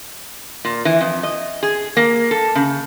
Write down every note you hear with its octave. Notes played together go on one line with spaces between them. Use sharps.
A#2
E3
F2
D#5
G#4
A#3
A4
C#3